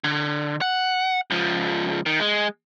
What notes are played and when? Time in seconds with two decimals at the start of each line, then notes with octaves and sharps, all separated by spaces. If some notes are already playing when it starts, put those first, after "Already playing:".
0.04 D3
0.61 F#5
1.30 C#2 F3
2.06 D#3
2.20 G#3